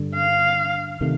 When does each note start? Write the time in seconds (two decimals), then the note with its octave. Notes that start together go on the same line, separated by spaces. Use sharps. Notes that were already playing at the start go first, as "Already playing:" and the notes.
Already playing: G2 D3
0.15 F5
1.01 C3 D#3 A3